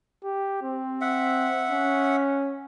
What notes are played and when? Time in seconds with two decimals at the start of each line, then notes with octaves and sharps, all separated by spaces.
0.24 G4
0.63 C4
1.01 E5 F#5
1.71 C#4